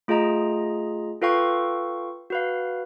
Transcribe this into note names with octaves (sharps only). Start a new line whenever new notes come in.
A3 F4 G#4 D#5 A#5
F4 A4 B4 F5 G5 C#6
F#4 B4 F5